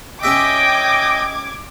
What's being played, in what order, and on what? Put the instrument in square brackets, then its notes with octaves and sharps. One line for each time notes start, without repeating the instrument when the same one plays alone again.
[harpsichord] C#4 G4 E5 [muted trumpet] D#5 [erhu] G5 [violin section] D6 G#6